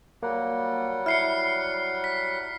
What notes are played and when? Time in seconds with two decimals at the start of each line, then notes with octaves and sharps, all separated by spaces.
0.23 F#3 G3 A#3 F#5
1.06 E4 F6 C7 C#7
2.04 B6